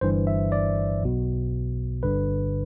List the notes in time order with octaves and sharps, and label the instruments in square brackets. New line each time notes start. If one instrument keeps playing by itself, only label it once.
[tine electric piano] G1 G2 E3 C5
E5
D5
B1 B2
G1 G2 D3 B4